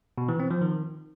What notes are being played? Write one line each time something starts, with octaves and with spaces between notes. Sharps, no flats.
B2
E3
C4
F3
D#3